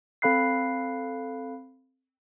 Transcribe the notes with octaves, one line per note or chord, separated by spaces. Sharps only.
C4 A4 F5 B5 F#6 C7